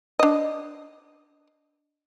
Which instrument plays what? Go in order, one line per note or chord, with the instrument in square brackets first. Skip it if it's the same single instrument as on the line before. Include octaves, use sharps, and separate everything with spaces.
[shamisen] D4 D#5